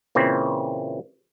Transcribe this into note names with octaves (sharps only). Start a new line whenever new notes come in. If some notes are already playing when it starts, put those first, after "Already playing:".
A#2 C#3 E3 C4